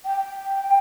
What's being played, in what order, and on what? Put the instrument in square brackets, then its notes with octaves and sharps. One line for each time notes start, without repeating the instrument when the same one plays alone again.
[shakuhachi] G5